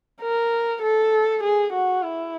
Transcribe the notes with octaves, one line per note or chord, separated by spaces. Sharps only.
A#4
A4
G#4
F#4
E4